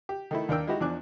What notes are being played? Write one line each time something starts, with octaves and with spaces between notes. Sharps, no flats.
G4
D#3 A3 E4
D#2 D4 A#4 G5 E6
G#3 D#4 E4 F#4 G4
E2 F3 D4 G#5 D6 F#6